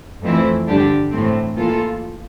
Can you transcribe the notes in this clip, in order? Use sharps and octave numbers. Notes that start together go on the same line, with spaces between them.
F2 E3 A3 C4 E4
G2 D3 G3 D4 G4
A2 E3 A3 C4
E3 A#3 F4 A4